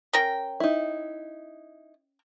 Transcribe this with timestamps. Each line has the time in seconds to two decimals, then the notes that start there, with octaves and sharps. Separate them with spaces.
0.13 C#4 A#4 G5
0.60 D#4 E4